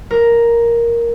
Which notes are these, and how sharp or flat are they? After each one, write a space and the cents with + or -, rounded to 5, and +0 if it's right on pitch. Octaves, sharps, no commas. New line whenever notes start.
A#4 +5